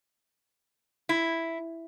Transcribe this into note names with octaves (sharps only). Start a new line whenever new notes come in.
E4